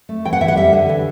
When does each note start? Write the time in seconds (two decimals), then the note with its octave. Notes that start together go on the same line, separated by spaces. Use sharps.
0.09 A3
0.25 E3 G5
0.33 F#5
0.41 E3 E5
0.48 F#5
0.56 G3 E5
0.73 D3
0.89 E3